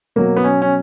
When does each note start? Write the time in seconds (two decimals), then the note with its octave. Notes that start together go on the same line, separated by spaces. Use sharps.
0.16 B2 F#3 A#3
0.37 B3
0.44 C#4
0.62 C#4